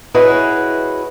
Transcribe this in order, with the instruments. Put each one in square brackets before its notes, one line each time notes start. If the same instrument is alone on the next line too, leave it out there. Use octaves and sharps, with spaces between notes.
[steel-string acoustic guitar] E4 F#4 G#4 B4 C#5 D#5